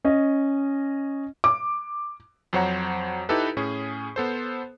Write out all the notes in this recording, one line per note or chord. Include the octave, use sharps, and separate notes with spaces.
C#4 D#5
D6
F2 F#3 C5 C#5 F#5 A#5
D#4 E4 G4 A4 B4
A2 C#4 G#4
B3 A4 C5